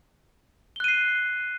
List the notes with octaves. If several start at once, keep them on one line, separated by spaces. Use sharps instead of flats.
F#6 C7 D#7 G7